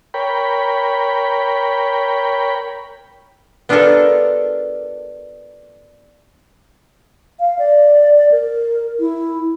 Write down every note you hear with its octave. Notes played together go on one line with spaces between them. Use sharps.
A#4 C#5 G5 B5
B3 D4 F4 G4 A4 A#4
F5
D5
A#4
E4